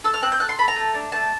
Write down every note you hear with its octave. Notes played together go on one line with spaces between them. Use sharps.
A4 E6
F6
C4 F#6
G6
A4 F#6
C6
A4 B5
A#5
A3
D4
A3 A5